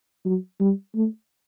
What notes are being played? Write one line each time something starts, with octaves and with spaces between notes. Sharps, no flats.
F#3
G3
A3